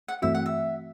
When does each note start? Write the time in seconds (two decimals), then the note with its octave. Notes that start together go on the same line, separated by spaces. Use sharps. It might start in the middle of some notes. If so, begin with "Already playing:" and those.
0.08 F#5
0.22 G2 E3 A3 C4 F#4 E5
0.35 F#5
0.46 E5